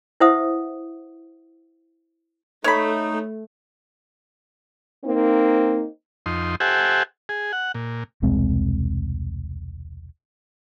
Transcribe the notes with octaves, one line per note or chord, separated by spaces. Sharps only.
E4 B4 C5 E5 F#5 D#6
A3 D#4 C#5 B5
A#3 C4 D#4
F2 D#4 C6
G4 A4 C5 E5 F#5 G#5
G#4
F#5
A#2
E1 C2 G#3 C4